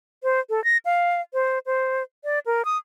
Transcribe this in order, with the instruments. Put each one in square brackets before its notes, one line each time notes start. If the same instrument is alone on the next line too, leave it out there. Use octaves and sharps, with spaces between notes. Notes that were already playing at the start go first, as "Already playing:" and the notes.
[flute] C5
A4
A#6
F5
C5
C5
D5
A#4
D#6